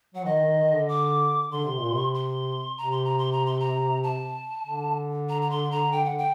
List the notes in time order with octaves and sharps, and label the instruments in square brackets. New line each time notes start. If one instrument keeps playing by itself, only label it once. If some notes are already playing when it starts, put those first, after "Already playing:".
[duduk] F#3 [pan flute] F#5
[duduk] D#3 [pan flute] D#5
[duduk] D#3
D#3
D3
[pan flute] D6
[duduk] D3 [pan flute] C6
[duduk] C3
A#2
C3
[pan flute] C6
[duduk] C3 [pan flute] A#5
[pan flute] C6
A#5
C6
A#5
C6
A#5
A5
[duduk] D3
[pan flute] A#5
A#5
C6
A#5
G5
F#5
G5